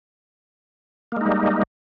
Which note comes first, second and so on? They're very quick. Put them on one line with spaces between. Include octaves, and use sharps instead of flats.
A#3 G#3 D#4 G3